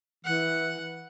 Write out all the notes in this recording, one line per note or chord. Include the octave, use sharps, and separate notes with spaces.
E3 F#5